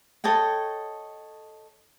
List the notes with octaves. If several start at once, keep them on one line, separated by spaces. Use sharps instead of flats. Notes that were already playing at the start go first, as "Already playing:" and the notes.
A4 C#5 D#5 G5